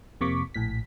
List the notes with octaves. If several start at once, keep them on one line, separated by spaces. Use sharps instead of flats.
F2 C3 A#3 C#6 D6 B6
A#1 A2 B6